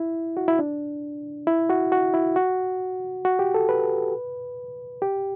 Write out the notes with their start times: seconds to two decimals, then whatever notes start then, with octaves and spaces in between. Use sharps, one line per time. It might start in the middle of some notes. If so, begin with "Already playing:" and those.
Already playing: E4
0.37 F#4
0.48 E4
0.59 D4
1.47 E4
1.70 F#4
1.92 F#4
2.14 E4
2.36 F#4
3.25 F#4
3.39 G4
3.54 A4
3.69 B4
5.02 G4